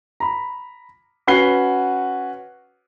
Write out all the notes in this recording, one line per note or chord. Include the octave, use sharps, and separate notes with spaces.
A#5 B5
C#4 F#4 B4 F#5 C7 G7